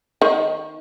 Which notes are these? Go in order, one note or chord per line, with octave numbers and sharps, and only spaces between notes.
D#3